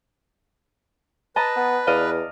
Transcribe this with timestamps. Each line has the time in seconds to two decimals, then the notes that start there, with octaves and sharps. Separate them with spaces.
1.36 B4 D#5 A5 A#5
1.57 B3
1.87 E2 D5 D#5 F5